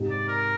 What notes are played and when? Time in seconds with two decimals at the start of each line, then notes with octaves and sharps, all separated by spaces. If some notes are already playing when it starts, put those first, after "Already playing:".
Already playing: G#2 C3
0.10 D5
0.28 A#4